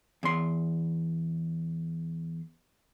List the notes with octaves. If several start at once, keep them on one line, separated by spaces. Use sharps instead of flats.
E2 C6